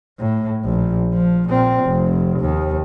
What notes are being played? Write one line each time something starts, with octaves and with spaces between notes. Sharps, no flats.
A2
A#1
F3
A#2 C4
F1
D#2